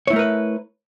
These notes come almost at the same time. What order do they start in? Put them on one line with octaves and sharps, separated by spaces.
C#5 E4 A3 A#4 B4